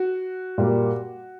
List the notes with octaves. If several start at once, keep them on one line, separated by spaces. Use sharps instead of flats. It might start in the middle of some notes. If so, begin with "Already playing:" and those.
Already playing: F#4
A#2 G3 A#3